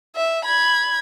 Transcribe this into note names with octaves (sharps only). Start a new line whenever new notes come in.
E5
B5 G#6